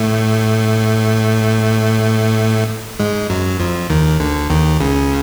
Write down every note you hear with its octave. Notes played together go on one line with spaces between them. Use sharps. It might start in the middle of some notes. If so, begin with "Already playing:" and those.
Already playing: A2 A3
G#2 G#3
F#2 F#3
F2 F3
D#2 D#3
D2 D3
D#2 D#3
C#2 C#3